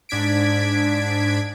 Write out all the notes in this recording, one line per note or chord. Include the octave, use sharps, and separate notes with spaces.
G#2 D4 G#6 B6 D7